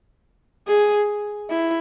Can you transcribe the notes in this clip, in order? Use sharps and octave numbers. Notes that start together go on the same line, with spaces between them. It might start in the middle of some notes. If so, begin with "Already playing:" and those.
G#4
E4